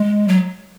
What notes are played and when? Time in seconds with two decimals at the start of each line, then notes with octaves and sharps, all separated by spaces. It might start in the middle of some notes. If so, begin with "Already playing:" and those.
Already playing: G#3
0.28 F#3